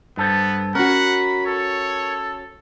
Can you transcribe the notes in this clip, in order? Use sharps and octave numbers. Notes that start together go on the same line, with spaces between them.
G2 B3 A4 C5
C#4 F#4 A#4 F#5 B5
A4 C#5